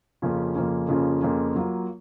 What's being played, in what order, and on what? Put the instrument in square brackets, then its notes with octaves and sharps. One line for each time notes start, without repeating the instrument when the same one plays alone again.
[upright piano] F2 C#3 F3 A#3 C#4
F2 C#3 F3 A#3 C#4
F2 C#3 F3 A#3 C#4
F2 C#3 F3 A#3 C#4
F#3 A#3 F4